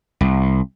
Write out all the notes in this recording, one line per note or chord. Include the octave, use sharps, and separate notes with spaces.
C2